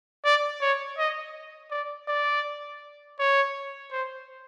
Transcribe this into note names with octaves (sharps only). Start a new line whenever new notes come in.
D5
C#5
D#5
D5
D5
C#5
C5